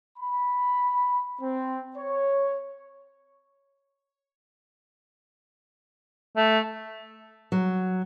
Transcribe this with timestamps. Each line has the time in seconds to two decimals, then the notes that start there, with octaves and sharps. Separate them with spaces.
0.18 B5
1.41 C4
1.96 C#5
6.37 A3
7.52 F#3